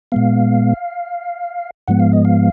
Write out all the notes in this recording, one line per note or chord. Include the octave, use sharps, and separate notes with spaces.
A#2 G#3 B3 F5
G#2 F3 G#3 B3 F#5
F5
D#5
F5